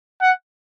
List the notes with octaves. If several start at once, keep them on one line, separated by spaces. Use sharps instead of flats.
F#5